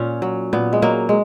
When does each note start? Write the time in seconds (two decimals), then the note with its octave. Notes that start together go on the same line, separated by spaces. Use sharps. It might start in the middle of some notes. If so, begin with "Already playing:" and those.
Already playing: A#2 C#4 F4
0.22 F#3
0.53 A#2 B3
0.73 G#3
0.82 F#3 A#3
1.09 G#3